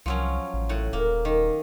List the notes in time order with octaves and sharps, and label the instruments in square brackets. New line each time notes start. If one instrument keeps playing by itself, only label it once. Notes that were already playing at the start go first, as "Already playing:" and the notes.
[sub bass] C2 [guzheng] F3 F#3 C#4
[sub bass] A1
[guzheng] A2 F#5
[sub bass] D#1 [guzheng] A#3
[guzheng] D#3